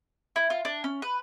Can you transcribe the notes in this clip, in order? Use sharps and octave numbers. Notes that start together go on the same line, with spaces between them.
E4
F4
D4
C#4
B4